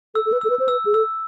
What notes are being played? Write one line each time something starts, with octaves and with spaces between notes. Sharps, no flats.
A4 E6
A4
B4
A4 E6
B4
C5
B4 E6
G#4
A4 E6